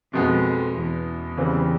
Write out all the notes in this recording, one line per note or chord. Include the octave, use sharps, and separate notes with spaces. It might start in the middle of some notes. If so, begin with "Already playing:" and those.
F2 B2 G#3 B3
E2
C#3 E3 G3 C4